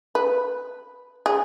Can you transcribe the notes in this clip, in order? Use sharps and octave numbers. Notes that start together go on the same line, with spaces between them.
B4
G#4